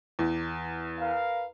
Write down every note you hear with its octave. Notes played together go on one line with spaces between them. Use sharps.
E2
A#4 B4 F5